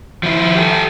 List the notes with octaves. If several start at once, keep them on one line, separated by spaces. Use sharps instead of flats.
F3 E4
G4 A4